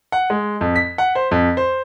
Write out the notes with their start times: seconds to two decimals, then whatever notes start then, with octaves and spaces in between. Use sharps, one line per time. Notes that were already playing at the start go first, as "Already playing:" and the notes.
0.12 F#5
0.30 G#3
0.61 F2
0.76 B6
0.98 F#5
1.15 C5
1.31 F2
1.57 C5